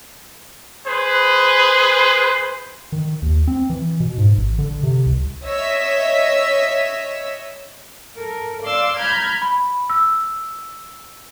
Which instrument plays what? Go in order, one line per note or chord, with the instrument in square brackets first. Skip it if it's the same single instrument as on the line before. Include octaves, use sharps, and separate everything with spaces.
[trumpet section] G#4 B4 C5
[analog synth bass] D#3
D#2
C4
E3
B2
G#2
A1
D3
C3
C2
[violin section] C#5 D#5 E5 E6 B6
[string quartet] A4 A#4
D5 F5 C6 D6 E6
A#5 B5 F6 G6 G#6
[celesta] B5
E6